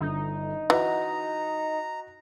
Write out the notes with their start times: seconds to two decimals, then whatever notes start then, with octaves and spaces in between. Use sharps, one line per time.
0.01 G1 D3 D#4
0.70 E3 F#4 D#5 F#5 A#5